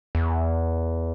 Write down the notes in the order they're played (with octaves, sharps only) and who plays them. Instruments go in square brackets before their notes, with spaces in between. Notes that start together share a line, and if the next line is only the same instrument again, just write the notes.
[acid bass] E2